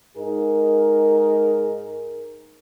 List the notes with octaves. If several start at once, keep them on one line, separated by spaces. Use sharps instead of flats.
G#2 D#4 G#4 A#4